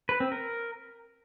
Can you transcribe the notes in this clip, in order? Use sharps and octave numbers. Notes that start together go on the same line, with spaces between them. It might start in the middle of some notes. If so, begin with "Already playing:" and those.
B4
C4
A#4